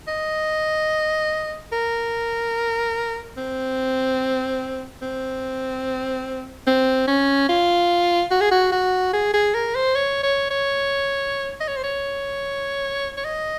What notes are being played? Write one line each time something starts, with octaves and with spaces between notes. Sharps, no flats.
D#5
A#4
C4
C4
C4
C#4
F4
F#4
G#4
F#4
F#4
G#4
G#4
A#4
C5
C#5
C#5
C#5
D#5
C#5
C5
C#5
C#5
D#5